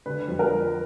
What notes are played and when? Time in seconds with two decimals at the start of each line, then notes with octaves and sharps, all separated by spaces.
0.06 D3 B4
0.28 F2
0.39 A#4
0.50 F3